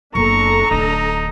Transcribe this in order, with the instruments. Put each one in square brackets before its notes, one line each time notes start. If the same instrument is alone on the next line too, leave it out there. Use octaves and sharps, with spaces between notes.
[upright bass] F#1 B3 [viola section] D4 A4 A#5 [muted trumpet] C#6
[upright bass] D1 D3 [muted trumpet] D#4